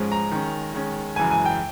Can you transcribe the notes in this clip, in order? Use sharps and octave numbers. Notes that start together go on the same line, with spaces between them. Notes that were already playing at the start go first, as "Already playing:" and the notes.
Already playing: G#2 F3 G#3 C#4
A#5
D#3 G#3 C#4
D#3 G#3 C#4
F#2 C#3 E3 G#3 G#5
G#5
G5